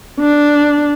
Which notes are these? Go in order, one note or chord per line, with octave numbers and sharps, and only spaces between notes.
D4